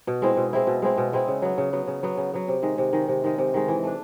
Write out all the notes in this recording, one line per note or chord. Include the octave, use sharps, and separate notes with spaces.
B2
G#3 C4 E4
B2
G#3 C4 E4
B2
G#3 C4 E4
B2
G#3 C4 E4
C#3
F#3 B3
C#3
F#3 B3
C#3
F#3 B3
C#3
F#3 B3
C3
D#3 G#3
C3
D#3 G#3
C3
D#3 G#3
C3
D#3 G#3
E3
A3 D4